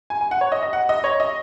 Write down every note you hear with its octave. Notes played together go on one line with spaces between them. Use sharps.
G#5
G#5
F#5
C#5
D#5
D#5
F#5
D#5
C#5
D#5